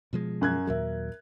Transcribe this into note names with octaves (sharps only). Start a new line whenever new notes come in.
B2 F3 G#3
F#2 F#6 G#6
D#2 A#2 F#3 A#4 E5